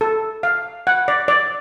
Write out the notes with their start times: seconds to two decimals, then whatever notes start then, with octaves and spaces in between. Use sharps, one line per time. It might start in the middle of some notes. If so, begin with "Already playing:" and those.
0.01 A4
0.43 F5
0.87 F#5
1.08 D5
1.28 D5